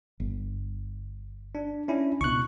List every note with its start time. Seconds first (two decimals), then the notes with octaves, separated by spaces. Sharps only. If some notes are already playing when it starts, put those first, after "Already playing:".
0.20 G1
1.55 D4
1.88 C#4 D4 E4
2.21 C#2 B2 C#6 F#6